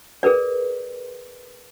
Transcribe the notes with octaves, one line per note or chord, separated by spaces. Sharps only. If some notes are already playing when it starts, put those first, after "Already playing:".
G#4 A#4 B4 D5